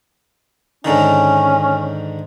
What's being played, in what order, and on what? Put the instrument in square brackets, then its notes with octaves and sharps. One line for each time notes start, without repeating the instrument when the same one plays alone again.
[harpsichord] G#2 D3 D#3 [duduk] C#4